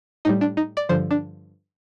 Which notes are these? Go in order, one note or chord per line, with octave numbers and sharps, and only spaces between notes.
A2 G3 D#4
D4
D#4
D5
G2 D3 F3 C5
D4